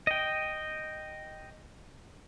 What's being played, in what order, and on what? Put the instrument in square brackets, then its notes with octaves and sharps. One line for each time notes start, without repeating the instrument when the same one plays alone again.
[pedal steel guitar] D#5 G5